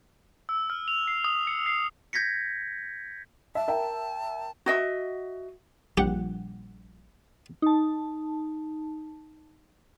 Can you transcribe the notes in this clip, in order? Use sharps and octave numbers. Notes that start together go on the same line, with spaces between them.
E6
F6
F7
C7
D#6
C#7
C7
G6 G#6 A#6 B6 C#7
E5 A5
A#4 E5 G5
F#4 D#5 E5
A#1 G3 G4 F#5
D#4 A5